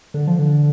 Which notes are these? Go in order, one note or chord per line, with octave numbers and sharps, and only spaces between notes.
D3
F3
D3